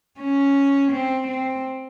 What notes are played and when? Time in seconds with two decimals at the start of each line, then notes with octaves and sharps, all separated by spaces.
0.20 C#4
0.92 C4
1.28 C4